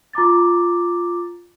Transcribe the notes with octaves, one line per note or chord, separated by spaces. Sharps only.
F4 A#5 D6 A6